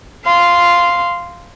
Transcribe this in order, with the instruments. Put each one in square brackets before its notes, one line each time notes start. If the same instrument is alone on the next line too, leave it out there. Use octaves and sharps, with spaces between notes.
[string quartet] F5 C6